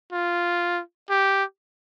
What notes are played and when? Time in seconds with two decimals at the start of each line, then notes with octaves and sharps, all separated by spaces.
0.13 F4
1.10 G4